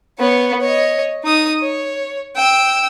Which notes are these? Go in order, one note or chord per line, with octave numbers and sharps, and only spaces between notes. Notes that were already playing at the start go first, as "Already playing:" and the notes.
B3 C#5
C#5 D#5
D#4 D#6
C#5
G5 E6